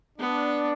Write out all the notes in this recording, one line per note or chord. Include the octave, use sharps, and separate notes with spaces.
B3 D4